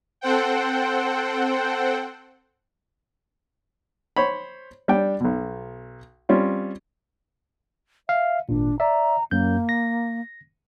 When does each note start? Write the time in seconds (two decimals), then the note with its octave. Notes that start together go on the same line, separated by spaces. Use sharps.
0.21 C4 A4 C5 F#5 G5
4.16 C5 C#5 B5
4.88 G3 D4 D5 G5
5.20 B1 B2
6.29 G3 C4 C#4 F4
8.09 E5 F5
8.49 G#1 A#2 D4
8.80 D5 E5 A#5
9.31 F#2 A#3 G6
9.69 A#6